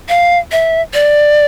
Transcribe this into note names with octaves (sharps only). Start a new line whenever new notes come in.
F5
E5
D5